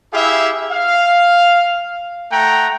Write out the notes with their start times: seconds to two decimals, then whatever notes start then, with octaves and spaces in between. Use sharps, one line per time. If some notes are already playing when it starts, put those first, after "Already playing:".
0.13 E4 G4 G#4 E5 F5
0.72 F5
2.32 A3 F#5 G5 A#5